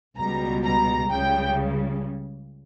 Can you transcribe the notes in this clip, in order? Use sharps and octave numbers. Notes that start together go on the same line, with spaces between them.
C#2 B2 G3 A#5
A#5
C#2 C#3 G3 G5